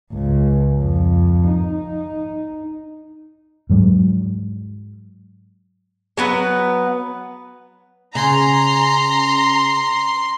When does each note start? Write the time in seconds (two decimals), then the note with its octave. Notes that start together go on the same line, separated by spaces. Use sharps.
0.13 C#2
0.78 F2
1.49 D#4
3.70 G#2 F#3 G#3
6.17 F#3 B3 B4
8.15 C#3 A#5 C6